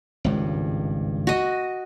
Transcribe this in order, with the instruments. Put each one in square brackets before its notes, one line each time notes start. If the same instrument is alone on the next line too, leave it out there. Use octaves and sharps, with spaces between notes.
[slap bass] G#1 C#2 G2
[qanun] F#4 D#5